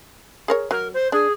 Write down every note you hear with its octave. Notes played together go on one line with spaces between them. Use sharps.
G#4 A#4 C#5
F#3 A#4
C5
D4 G#4